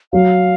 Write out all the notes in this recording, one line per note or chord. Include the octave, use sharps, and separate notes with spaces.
F#3 F5